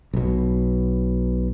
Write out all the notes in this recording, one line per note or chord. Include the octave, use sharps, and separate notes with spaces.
B1 B2